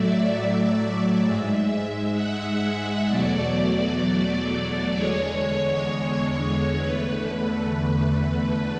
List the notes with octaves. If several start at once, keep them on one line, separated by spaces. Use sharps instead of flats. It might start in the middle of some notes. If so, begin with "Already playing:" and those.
Already playing: A2 F#3 A3 D5 E5
E5
G#2 G#3
F#5
E5
E2 B2 F#3 A3 D5
E2 D3 G#3 C#5
E2 D3 A3 B4